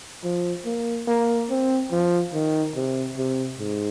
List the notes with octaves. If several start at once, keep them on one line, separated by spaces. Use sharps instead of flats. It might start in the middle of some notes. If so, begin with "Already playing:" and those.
F3
A#3
A#3
C4
F3
D#3
C3
C3
G#2